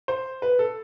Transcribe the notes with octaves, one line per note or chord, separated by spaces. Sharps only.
C5
B4
A4